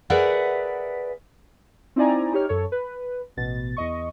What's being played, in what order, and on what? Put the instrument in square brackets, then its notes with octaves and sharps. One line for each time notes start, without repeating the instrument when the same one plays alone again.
[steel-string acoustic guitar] G#4 A#4 B4 D5 E5 F#5
[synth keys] C4 D#4 E4 D5 G#5 A#5
D#4 G4 C#5 F6
F#2 A4 C#5
B4
A1 B2 A6
E2 D#5 C#6